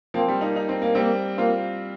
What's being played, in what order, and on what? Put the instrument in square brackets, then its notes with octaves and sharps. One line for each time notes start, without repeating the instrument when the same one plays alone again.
[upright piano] F3 A#3 [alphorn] C4
[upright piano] G3
A#3 D#4
D#4
C4
A#3
[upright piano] G3 C4 [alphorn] A#3
[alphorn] A#3 [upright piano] C4 F4